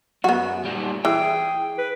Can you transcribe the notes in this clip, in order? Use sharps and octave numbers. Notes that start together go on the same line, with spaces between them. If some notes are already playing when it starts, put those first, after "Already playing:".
F#2 B3 F#4
A#2 G3
E3 G#4 G5
B4